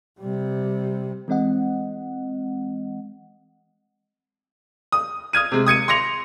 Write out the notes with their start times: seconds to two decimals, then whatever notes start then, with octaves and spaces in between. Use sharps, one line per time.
0.20 C3 G3
1.28 E3 G#3 C4 D#5 F#5
4.92 D#6
5.33 D#6 F6 G#6 D#7
5.52 C3 G#3
5.67 D#6 G#6 C#7 D#7
5.88 C6 D6 A#6 C#7 F7